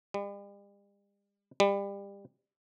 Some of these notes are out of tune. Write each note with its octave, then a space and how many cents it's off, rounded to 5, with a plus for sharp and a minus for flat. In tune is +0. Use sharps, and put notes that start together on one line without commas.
G3 +40
G3 +25